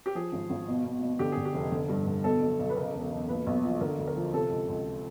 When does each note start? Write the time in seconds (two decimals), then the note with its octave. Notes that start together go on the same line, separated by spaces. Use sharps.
0.06 G4
0.15 F3 G#4
0.32 G#1
0.50 G#1
0.68 B2
0.85 B2
1.02 B2
1.19 D3 G4
1.32 G#4
1.37 D3
1.45 G4
1.54 F1
1.72 D3
1.89 G2
2.07 D3
2.24 B2 A4
2.42 B1
2.59 B1
2.70 B4
2.77 C#3 A#4
2.94 E1
3.12 E1
3.29 A#2 B4
3.47 B1
3.64 F3
3.81 D3 A#4
3.98 D2
4.07 A#4
4.16 F3
4.34 C3 A4
4.51 C#2
4.68 C#2